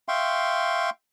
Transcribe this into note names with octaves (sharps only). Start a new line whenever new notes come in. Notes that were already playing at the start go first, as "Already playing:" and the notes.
E5 F5 G5 C6 C#6